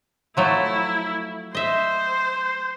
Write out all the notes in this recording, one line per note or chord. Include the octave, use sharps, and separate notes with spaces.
F3 F#3 A3 E4
C5 D#5 E5